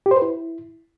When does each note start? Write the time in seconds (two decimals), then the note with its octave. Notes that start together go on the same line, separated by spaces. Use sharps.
0.06 G4
0.11 C5
0.16 B4
0.22 E4